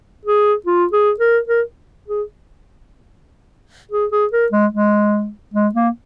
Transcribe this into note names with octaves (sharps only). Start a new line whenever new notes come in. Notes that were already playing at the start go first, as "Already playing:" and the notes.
G#4
F4
G#4
A#4
A#4
G#4
G#4
G#4
A#4
G#3
G#3
G#3
A#3